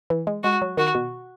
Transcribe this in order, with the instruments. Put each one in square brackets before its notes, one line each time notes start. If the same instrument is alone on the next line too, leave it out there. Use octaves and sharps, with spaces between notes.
[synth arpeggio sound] E3
G#3
[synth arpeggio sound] G#3 [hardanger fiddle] F#4
[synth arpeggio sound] F#3
[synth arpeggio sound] D#3 [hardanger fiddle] F#4
[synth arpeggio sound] B2